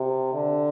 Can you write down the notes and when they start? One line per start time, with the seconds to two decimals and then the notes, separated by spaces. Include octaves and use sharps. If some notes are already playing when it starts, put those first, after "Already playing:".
Already playing: C3
0.34 D3